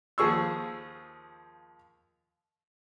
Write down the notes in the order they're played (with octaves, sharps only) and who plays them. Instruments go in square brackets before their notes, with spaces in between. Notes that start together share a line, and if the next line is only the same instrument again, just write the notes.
[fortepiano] D#2 F3 G#4 C#6 E6